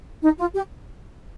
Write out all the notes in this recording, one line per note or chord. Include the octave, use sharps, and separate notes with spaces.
D#4
F4
G4